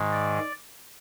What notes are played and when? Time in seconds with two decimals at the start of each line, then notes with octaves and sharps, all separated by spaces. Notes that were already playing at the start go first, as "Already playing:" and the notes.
Already playing: G#2 D#3 G#3
0.12 D5